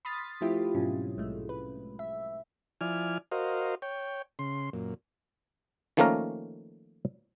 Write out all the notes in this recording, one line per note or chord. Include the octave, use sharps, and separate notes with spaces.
B5 C6 D#6 F6 A6 B6
F3 A3 C4 E4 F4 G4
G#2 B2 F#3 C#4
A#1 G#3 A3
B4
E5
F3 E4 D5 G#5 F6
F#4 A#4 C5 D#5 F5
C#5 G5
C#3 C6
F#2 A#2
D#3 F3 A3 A#3 C#4 A#4